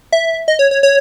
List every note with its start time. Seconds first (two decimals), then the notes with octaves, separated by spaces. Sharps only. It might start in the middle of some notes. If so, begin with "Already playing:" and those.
0.12 E5
0.48 D#5
0.59 C#5
0.71 C#5
0.83 C#5